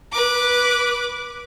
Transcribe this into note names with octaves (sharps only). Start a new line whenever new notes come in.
B4 D6